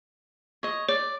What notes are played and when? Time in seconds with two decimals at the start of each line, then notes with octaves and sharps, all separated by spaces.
0.63 C#5 D#5
0.89 C#5 D5